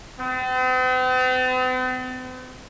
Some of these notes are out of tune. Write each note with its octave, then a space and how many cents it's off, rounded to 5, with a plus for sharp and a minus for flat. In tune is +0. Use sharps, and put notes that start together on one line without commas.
C4 -45